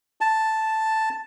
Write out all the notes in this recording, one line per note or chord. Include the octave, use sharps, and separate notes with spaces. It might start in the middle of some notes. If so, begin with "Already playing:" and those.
A5